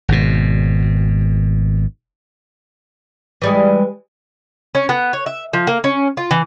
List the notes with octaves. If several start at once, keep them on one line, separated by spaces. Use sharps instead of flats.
G#1 B2
E3 G3 G#3
C#4
B3
C#5
E5
F3
A#3
C#4
F4
E3